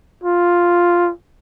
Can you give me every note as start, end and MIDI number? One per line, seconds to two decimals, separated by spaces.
0.24 1.11 65